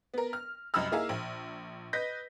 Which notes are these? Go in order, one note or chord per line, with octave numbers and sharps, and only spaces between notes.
B3 A#4
F6
C2 F#2 D#5 B5 E6 F6
A#3 D#4 E4 G#4 F5 A#5
A#1
B4 D#5 G6 A#6 B6